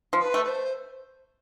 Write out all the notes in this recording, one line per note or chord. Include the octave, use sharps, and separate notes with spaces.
F3
B4
A3
B4
C5